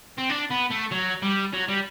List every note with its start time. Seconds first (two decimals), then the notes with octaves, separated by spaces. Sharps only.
0.18 C4
0.29 D4
0.50 B3
0.70 A3
0.91 F#3
1.22 G3
1.53 F#3
1.68 G3